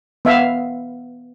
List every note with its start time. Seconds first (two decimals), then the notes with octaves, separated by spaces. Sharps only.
0.25 B3 E5 F5